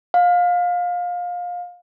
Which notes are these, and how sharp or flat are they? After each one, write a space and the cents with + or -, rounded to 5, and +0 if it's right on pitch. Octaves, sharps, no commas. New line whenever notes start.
F5 +25